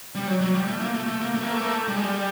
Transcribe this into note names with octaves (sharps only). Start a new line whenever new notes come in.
G3
F#3
F#3
G3
A3
A#3
A3
A3
A#3
A3
A#3
A3
A#3
A3
G3
G#3
G3